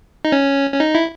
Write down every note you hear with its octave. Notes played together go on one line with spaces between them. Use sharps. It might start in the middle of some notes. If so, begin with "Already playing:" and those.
D#4
C#4
C#4
D#4
E4